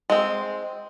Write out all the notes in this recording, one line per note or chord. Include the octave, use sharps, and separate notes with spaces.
G#3 C4